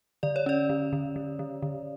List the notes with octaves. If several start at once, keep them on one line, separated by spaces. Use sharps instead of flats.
D3 D5
C#5
C#4 D5
D3
D3
D3
D3
D3